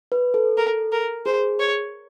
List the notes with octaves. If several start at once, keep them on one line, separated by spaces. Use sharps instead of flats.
B4
A4
A#4
A#4
G#4 C5
C#5